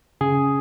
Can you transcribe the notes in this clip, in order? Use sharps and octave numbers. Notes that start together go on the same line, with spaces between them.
C#3 G#4